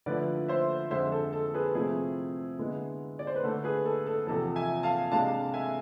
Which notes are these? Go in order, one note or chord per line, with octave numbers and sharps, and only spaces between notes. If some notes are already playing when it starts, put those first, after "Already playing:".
D3 F3 A3 E4 B4 D5
C5 E5
F2 D3 G#3 C5 E5
A4
A4
G#4 B4
C3 F3 A3 C4 E4 G#4
D3 G#3 B3 E4
D5
C5
B4
D3 A3 D4 A4
G#4 B4
A4
A4
E2 C3 F3 A4
E5 G#5
F5 A5
C3 G#3 D4 F5 A5
E5 G#5